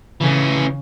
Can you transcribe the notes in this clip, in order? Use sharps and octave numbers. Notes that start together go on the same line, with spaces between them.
C#3 E3 C#4